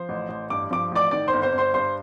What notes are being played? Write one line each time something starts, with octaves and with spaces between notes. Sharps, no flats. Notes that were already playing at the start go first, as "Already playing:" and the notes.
Already playing: F3 C5
A1
A1
G2 D6
F3 D6
A1 D5 D6
D#3 D5 D6
C5 C6
G1
C5 C6
G1
C5 C6
G2 C5 C6